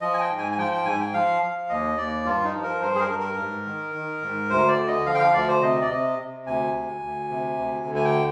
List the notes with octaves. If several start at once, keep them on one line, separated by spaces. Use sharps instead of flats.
F3 D#5
G#5
G5
G#2
G#5
G#5
F3 G5
G5
G#2 G#5
G5
F3 F5
F3
D#2 D#5
D#2 D5
G2 F4
D#4
F3
A#4
G2 C5
G#4
A#4
G2
A#4
G#2
D#3
D#3
G#2
D2 C5
D5
D3
D#5
F3 F5
G5
F5
D2 D5
C5
C3 D#5
D5
C3 D#5
C3
D2 G#5
D2
D2
C3
D2
D3
G#5
G5